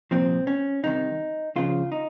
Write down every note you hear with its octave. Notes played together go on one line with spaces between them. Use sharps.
C2 A#2 F3 C4
C#4
C2 C3 D#3 D#4
C#2 C#3 F3 F4
D#4